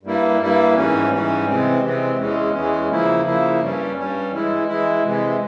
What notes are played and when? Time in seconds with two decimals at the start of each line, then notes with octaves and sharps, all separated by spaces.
0.03 G2 G3 A#3 E4
0.39 G2 G3 A#3 E4
0.75 G#2 E3 G3 C#4
1.10 G#2 E3 G3 C#4
1.46 C3 E3 G#3 C4
1.81 C3 E3 G#3 C4
2.18 E2 E3 G#3 C#4
2.53 E2 E3 G#3 C#4
2.89 C#3 F3 A#3 E4
3.25 C#3 F3 A#3 E4
3.60 G2 G3 C#4
3.96 G2 G3 C#4
4.32 E3 G#3 E4
4.67 E3 G#3 E4
5.03 C3 E3 G#3